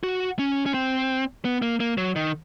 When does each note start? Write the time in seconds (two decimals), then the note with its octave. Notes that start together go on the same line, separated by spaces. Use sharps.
0.03 F#4
0.39 C#4
0.66 C#4
0.74 C4
1.45 B3
1.62 A#3
1.80 A#3
1.98 F#3
2.16 D#3